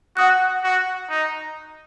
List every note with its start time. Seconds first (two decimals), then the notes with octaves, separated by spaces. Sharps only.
0.17 F#4 F#5 D#6 F#6
0.63 F#4
1.09 D#4